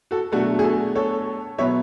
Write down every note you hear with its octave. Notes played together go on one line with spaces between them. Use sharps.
F#4 A4
B2 F#3 A3 D4 F#4 A4
G#4
F#4 A4
A4 C#5
B2 F#3 B3 C#5 E5